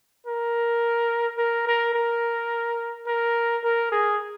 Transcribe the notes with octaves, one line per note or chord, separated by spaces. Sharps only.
A#4
A#4
A#4
A#4
A#4
A#4
G#4